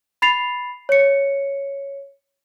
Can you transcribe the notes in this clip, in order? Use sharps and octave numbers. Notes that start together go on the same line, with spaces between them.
B5 A6 C7 F7
C#5 C#7